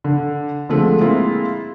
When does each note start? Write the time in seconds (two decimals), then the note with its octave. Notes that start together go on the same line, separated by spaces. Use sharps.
0.04 D3
0.69 D3 F3 G#3 A3 C4
1.01 G#3 A#3 C4 E4 F4